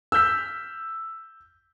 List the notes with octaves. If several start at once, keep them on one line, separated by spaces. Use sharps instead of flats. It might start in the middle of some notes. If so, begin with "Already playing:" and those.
E6 F6 G6 B6